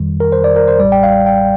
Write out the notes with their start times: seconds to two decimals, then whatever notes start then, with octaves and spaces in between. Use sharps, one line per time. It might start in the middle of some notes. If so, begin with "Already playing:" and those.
Already playing: F2 D#3 G3
0.20 A#4
0.32 C5
0.44 D5
0.56 A#4
0.68 C5
0.80 A1 A2 G3 D5
0.92 G5
1.03 F5
1.26 G5